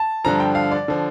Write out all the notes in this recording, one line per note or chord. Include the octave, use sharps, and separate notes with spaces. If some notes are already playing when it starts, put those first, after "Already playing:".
Already playing: A5
G2 D3 F3 A#5
G5
F5
D5
D3 F3